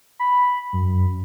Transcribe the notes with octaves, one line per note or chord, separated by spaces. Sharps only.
B5
F#2